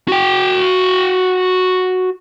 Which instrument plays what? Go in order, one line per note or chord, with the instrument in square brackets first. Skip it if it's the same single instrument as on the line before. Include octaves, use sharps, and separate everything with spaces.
[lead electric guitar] F#4 G5